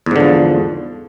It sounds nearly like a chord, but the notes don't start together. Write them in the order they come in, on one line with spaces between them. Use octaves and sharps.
E2 G#2 D3 F3